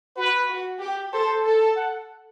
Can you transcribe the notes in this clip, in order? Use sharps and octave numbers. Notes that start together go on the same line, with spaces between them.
F#4 B4
F#4
G4
A4 C5
A4
F#5